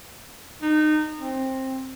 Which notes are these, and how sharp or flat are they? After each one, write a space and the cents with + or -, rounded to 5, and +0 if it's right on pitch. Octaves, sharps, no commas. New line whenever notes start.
D#4 -25
C4 +15